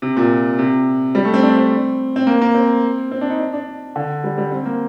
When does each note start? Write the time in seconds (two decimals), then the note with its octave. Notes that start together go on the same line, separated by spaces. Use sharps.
0.02 C3
0.17 A#2
0.59 C3
1.15 G3
1.25 A3
1.34 C4
1.43 D4
1.57 C4
2.16 C4
2.27 A#3
2.41 A#3
2.55 C4
3.12 C4
3.21 D4
3.30 D#4
3.39 D4
3.53 D4
3.96 D3
4.24 G3
4.38 G3
4.52 C4
4.66 A#3